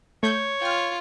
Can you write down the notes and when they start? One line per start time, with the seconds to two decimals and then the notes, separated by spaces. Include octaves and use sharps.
0.23 A3 C#5 G6
0.62 F4 G5 F6